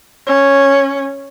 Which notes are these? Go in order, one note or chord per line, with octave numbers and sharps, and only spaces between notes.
C#4